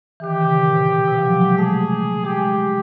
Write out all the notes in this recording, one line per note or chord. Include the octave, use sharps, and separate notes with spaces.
E3
D#3 G4
C#3
A#2
C3
B2
C3
F3
F#3
G#3
A3 G#4
G#3 G4